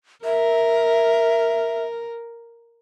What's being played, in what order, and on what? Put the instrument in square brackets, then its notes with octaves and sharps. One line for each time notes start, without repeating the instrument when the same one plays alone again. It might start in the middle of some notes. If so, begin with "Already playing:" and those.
[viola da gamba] A#4 [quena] E5